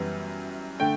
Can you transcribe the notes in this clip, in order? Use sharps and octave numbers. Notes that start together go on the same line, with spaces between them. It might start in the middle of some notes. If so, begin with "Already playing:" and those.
Already playing: F#2 E3 G3 B3
D3 A3 G5